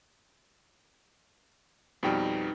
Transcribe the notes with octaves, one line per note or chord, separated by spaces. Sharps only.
F2 B2 G3 B3 D#4 G5